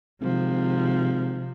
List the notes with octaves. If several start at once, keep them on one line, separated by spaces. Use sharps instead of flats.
G#1 C3 F3